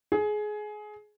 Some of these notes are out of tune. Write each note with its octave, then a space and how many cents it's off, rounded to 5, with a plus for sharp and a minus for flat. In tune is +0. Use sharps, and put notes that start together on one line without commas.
G#4 +20